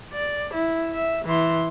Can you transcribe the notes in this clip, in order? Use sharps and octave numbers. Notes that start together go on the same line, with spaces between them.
D5
E4
E5
E3 C6